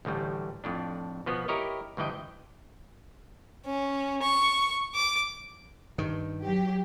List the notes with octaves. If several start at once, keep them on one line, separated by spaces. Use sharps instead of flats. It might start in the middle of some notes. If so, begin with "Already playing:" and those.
A1 D2 A2 G3
F2 A2 D4
B2 F3 B3
E4 G4 A#4 C#5 D#5
D2 G2 E3 D#5 G5
C#4
C#6
D6
G2 D#3
F#3 G4